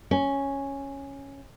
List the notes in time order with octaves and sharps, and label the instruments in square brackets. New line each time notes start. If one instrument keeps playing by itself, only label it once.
[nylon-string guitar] C#4